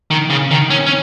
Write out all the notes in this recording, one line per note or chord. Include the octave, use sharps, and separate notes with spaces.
D#3
C#3
D#3
C#4
C#4